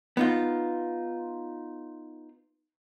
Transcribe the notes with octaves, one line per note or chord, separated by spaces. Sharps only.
B3 D#4 F4